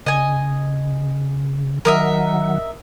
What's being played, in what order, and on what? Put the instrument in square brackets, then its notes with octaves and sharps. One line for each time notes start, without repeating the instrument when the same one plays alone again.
[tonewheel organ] C#3 [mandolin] D#5 G#5
[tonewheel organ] D#3 F#3 F#5 [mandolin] A#4 D#5 E5